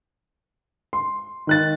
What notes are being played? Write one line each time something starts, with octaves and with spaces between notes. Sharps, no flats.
C6
D#3 F#6 A6